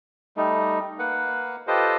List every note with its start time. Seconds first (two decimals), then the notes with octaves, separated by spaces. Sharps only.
0.37 G3 A3 D#4
0.99 A#3 B4 F#5
1.67 F4 G4 A4 B4 C5 D#5